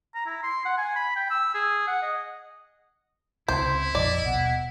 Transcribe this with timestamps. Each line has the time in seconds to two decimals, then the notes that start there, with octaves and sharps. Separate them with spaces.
0.15 A#5
0.26 E4
0.43 C6
0.65 F#5
0.78 G#5
0.96 B5
1.16 G5
1.30 E6
1.55 G#4
1.88 F#5
2.03 D#5
3.48 C#2 C3 E4 C5
3.95 A#1 F2 D5 D#5
4.26 D#1 B2 F#5